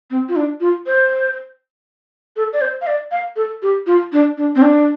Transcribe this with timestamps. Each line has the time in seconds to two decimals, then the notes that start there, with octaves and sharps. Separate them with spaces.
0.11 C4
0.29 F4
0.36 D4
0.61 F4
0.87 C5
2.36 A4
2.53 D5
2.61 C5
2.81 F5
2.87 D5
3.11 F5
3.36 A4
3.62 G4
3.87 F4
4.13 D4
4.38 D4
4.56 C4
4.62 D4